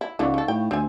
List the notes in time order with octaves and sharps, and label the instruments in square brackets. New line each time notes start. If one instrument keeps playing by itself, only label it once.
[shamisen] E4
[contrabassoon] C#2 [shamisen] D3 E3 B3 [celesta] D#4 F5 C#6
[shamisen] D3 A4
[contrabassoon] A2 [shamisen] G5
[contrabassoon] D2 [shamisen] C4 G#5